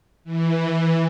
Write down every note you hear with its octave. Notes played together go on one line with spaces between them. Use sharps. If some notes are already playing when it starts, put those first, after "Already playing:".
E3